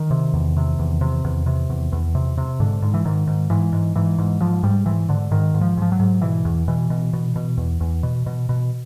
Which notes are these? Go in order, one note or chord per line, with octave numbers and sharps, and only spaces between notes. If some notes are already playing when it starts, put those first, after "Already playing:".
Already playing: D#3
C3
E2
C3
E2
C3
E2
C3
E2
E2
C3
C3
G#2 D3
G#2
E3
G#2 D#3
G#2
G#2 E3
G#2
G#2 E3
G#2
G#2 F3
G#2 G3
G#2 E3
G#2 D3
G#2 D#3
G#2
F3
G#2 F3
F#3
G#2
B2 E3
E2
B2 E3
B2
B2
B2
E2
E2
B2
B2
B2